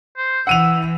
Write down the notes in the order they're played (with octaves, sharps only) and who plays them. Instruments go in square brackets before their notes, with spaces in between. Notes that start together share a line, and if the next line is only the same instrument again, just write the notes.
[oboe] C5
[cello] E3 [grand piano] F#5 D#7 F7 [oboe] E6